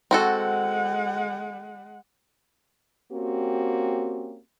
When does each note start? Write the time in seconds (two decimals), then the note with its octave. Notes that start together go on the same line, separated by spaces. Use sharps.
0.11 G#3 C4 F#4 A4 F#5
3.11 A#3 C4 C#4 F#4 G4